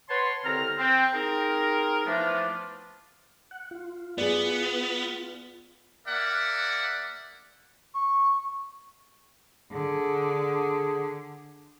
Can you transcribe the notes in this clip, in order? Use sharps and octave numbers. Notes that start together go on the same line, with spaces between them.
B4 C#5 F#5 A5 C6
C2 D3 C4 A#5 F6
C4
C4 D#4 G#4 A#4
E3 F3 A3 B3 D4 F4
F#5
F4
B3 G#4 D5
A#3 A#4 D5 E5 F#5
C#6
D3 G#4